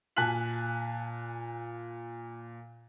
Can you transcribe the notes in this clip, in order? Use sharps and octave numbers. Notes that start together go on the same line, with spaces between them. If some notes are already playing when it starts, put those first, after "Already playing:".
A#2 G#5 A5 F#6 B6 F#7